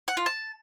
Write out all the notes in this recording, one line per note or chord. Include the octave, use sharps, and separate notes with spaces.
F#5
F4
A5